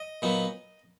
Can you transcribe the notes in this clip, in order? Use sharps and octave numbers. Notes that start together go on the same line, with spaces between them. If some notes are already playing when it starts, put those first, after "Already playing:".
Already playing: D#5
A#2 F#3 B3 D#4